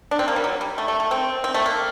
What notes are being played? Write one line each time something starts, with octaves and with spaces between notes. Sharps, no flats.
D4
C4
A#3
G3
F#3
G3
A3
A3
A3
C4
C4
A3
A#3